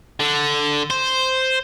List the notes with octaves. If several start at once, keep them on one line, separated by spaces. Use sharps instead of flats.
D3
C5